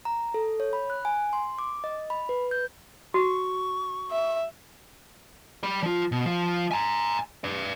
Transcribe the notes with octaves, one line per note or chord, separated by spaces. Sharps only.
A#5
A4
C#5
B5
F#6
G#5
C6
D6
D#5
B5
B4
G6
F#4 C#6
E5
D5 B5
F3 F4
B2
F3
G#5 A#5
B4 D5